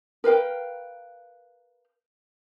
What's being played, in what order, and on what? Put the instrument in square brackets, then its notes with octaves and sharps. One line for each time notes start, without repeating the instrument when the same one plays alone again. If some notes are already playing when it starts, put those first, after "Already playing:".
[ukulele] A#4 B4 F5 G5